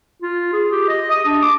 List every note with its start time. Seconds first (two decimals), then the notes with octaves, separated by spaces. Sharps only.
0.22 F4
0.53 G#4
0.71 G4
0.88 D#5
1.11 D#6
1.25 D4
1.42 D6